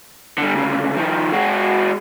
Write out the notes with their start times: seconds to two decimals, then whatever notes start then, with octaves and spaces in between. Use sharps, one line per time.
0.38 D3 G3
0.55 D2 C#3
0.97 D#3 F3
1.33 G#3 F#4